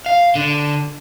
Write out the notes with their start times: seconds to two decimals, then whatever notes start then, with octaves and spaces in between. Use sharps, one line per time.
0.06 F5
0.35 D3